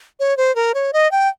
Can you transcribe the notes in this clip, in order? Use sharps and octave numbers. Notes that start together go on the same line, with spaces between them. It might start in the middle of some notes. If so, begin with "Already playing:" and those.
C#5
C5
A#4
C#5
D#5
G5